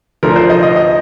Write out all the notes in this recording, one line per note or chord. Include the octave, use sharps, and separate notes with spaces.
D2 D3 F3 A#4
C5
D#5
D#5
D#5